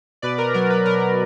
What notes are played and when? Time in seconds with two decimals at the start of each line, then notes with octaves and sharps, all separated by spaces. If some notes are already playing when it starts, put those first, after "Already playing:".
0.22 B2 B4 D5
0.38 A#4
0.54 F#3 A#4
0.70 B4
0.86 B2 A#4